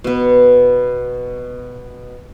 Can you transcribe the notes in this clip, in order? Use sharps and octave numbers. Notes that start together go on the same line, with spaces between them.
B2 B3